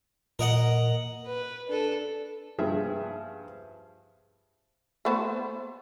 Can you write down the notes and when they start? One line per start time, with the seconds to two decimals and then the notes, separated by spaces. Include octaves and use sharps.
0.39 A#2 A#4 D#5 F#5
1.26 B4
1.68 D4 A4
2.59 G2 F3 G#4 E5
5.05 A3 B3 C5